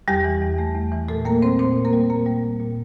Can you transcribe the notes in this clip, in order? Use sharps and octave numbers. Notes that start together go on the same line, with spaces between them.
E2 G3 G4
E3
E2
A3
E2
E3
A#2 A3 A4
G3 A#3 A#4
G3 C4 C5
A#2 C4 C5
A#2
A#3 A#4
G3
A#2 A#3 A#4
G3
G3
A#2